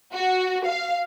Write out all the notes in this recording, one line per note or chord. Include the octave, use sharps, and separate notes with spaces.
F#4
F5